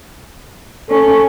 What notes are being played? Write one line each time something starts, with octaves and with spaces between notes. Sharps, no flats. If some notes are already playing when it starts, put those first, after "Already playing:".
C#4 A4